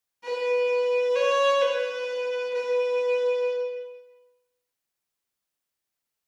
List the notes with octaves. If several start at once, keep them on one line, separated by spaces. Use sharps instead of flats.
B4
C#5
B4
B4